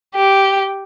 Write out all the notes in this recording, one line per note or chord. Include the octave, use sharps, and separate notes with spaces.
G4